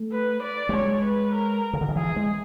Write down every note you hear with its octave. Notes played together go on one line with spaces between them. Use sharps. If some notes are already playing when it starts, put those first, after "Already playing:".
Already playing: A3
B4
D5
G3
G#3 C#5
B4
A#4
C#3
D3
D#3
E3 G#4
G#3